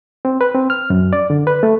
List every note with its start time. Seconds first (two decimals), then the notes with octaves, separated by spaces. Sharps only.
0.25 C4
0.41 B4
0.54 C4
0.70 F6
0.90 F#2
1.13 D5
1.30 D3
1.47 B4
1.63 A3